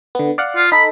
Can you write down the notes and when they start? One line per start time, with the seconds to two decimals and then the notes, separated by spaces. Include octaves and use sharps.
0.15 D3 B3
0.38 D5 F5 F#5
0.56 F4
0.72 D#4 A4 B5